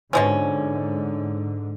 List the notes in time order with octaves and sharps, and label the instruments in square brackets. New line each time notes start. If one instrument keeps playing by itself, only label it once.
[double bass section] G#2 D3 [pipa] B2 F3 C#4